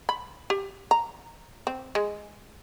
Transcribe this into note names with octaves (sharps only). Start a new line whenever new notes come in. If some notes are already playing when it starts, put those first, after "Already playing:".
B5
G4
A#5
C4
G#3